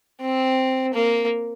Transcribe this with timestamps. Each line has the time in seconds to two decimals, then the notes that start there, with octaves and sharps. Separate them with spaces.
0.21 C4
0.94 A#3